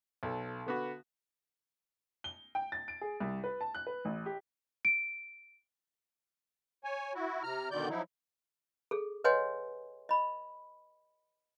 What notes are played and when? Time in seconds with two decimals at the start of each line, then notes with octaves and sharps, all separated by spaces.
0.23 B1 A4
0.66 D3 B3 F#4
2.24 G7
2.55 G5
2.72 A6
2.88 D7
3.01 G#4
3.21 C2
3.44 B4
3.61 A5
3.75 F#6
3.87 B4
4.05 A1
4.26 G4
4.85 D7
6.84 C#5 G#5
7.14 E4 F#4
7.43 C3 A#5 F6
7.71 B2 D3 D#3 D5 G6
7.89 F3 F#3 D#4 E4
8.91 G#4 A4
9.24 B4 C#5 D#5 F#5 G#5 C6
10.09 D#5 B5